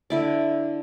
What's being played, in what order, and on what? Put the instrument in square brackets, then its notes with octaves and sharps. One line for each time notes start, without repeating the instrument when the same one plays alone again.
[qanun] D3 E4 D5